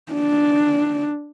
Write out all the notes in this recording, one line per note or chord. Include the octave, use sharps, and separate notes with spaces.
D4